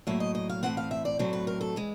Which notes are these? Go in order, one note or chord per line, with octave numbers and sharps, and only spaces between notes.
A2 F#3 A#3 E5
D#5
D#5
F5
A2 E3 G#3 C4 F#5
F5
E5
D5
A2 F#3 A3 C4 C5
B4
A#4
A4
E3 G#3